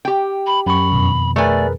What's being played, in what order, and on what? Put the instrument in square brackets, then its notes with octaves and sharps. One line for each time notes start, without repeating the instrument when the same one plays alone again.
[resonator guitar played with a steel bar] G4 G5
[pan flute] B5
[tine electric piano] F#2 C#6 [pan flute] B5
[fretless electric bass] F2 B2 D#3
[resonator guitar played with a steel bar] A3 G#5 [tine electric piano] G#4 A#4 B4 [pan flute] D5